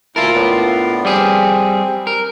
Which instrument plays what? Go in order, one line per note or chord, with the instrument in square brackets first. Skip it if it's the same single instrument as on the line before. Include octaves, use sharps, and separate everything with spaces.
[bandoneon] D2 E4 A5 [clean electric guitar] F4 A#4
[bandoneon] A2 B3 D4
[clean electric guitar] G3 G#4 [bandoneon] C4
[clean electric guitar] A#4